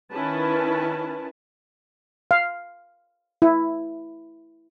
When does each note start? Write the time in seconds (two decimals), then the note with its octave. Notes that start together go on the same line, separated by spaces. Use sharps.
0.11 D#3 C#4 E4 B4 A5
2.31 F5
3.42 E4